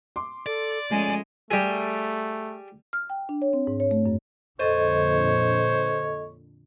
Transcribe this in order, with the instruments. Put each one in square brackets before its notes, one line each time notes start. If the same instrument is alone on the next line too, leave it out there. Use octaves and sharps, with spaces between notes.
[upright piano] C6 D6
[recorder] A4 [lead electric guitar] D5
[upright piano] F3 A3 C#4 [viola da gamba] G#3 [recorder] G#5
[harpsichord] G3 G#4 [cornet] A3
[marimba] F6
G5
D4
C#5
C4
G#2
C#5
A3
F#2
[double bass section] F2 A#2 D3 [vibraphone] A4 D#5 [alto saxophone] C5 [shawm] C#5